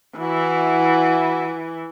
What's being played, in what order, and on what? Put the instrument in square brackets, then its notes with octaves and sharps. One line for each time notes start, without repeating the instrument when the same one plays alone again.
[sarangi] E3 [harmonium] E4 F#4